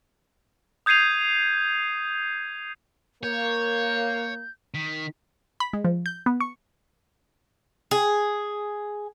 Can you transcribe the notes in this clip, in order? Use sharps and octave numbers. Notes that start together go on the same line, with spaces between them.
D#6 G6 G#6 C7 D#7 F7
A#3 C#5 G6
D#3 B6
B5
G#3
F3
G6
B3
C#6
G#4